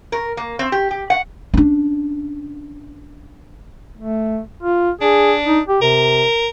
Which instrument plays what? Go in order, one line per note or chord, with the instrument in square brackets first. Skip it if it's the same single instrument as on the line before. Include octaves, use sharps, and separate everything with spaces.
[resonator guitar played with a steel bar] A#4
A#3
C4
G4
G4
F#5
[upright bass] C#4 D4
[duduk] A3
F4
[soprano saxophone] D4 [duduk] G#4
[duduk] D#4
G4
[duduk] C3 [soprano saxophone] A#4